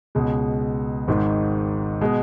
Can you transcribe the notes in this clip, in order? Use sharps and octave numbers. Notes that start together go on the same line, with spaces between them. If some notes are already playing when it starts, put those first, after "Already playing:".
C#2 B2 G#3
G#1 G#2 D#3
B2 G#3